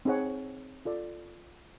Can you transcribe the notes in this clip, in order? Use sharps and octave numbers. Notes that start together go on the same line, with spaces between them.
C4 D#4 G#4 C#5 F#5
F4 A4 D5